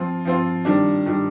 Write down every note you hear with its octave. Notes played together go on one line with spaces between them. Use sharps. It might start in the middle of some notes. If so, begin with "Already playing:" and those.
Already playing: F3 C4 F4
F3 C4 F4
D#3 G3 D4
D#3 G3 D4